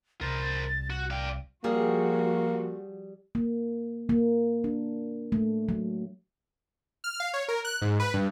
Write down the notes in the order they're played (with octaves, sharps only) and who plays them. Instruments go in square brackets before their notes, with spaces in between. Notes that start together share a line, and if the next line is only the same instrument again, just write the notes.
[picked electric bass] C2 [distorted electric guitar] A#4 C5 [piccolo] A6
[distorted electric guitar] F#4 [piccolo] F#6
[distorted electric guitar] D5 F5 [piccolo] G5
[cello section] F3 F#4 [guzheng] G3 G#4 [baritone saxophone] A#3
[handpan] A#3
A#3
D4
A3
F#3
[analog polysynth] F6
F5
C#5
A#4
F#6
G#2
B4
G2